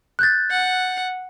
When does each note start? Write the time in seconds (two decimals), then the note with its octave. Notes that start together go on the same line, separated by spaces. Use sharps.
0.19 F#6 G6 A6
0.50 F#5